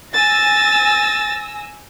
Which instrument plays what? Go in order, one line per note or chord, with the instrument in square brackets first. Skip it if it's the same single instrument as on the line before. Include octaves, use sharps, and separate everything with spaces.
[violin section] G#5 E6 A#6 [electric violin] A6